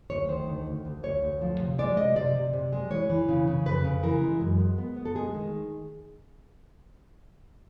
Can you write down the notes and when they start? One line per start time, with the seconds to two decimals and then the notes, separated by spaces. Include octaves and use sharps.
0.10 D2 C#5
0.29 D#3 C5
0.48 D2
0.66 D2
0.85 D2
1.03 D2 C#5
1.22 D2
1.41 F3
1.60 C3
1.78 G#3 D5
1.97 C3 D#5
2.16 C3 D5
2.35 C3
2.53 C3
2.72 G#3
2.91 E3 C#5
3.10 E3
3.29 C#3
3.47 C#3
3.66 F2 B4
3.85 C#3
4.03 E3 A#4
4.22 G#3
4.41 F#2
4.60 G#3
4.78 B3
4.96 B3
5.05 A4
5.15 G#3 G#4
5.34 D#3